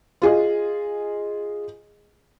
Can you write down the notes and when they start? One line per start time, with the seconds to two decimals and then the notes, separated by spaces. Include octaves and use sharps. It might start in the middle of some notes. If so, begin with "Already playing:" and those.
0.22 F4 G#4 D#5